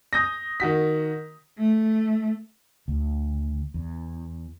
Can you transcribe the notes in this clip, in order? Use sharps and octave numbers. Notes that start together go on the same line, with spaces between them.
D#6 G6 A#6
D#3 F#4 B6
A3
D2
E2